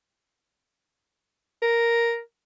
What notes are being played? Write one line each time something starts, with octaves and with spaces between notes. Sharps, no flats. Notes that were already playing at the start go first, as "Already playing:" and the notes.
A#4